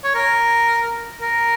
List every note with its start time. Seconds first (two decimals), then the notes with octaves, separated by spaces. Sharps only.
0.04 C#5
0.15 A#4
1.22 A#4